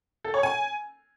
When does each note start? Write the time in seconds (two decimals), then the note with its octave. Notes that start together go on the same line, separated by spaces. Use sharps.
0.24 A4
0.34 C#5
0.43 G#5